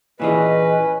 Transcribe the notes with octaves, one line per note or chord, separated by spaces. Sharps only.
A#2 E3 C#4 G#4 B4 D#5